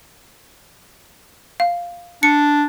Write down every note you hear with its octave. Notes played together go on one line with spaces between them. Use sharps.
F5
D4 C#7